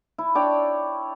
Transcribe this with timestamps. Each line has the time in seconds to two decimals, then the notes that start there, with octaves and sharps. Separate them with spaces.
0.18 E4
0.35 D4 C#5 D5 G5